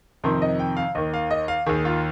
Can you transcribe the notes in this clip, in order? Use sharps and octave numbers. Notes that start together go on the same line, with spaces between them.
F2 C3 D#3 C5
D#5
G5
F5
D#2 D#3 D#5
F5
D#5
F5
D#2 D#3 G#4
F4